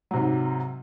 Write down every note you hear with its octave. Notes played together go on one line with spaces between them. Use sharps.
G#2 C3 F#3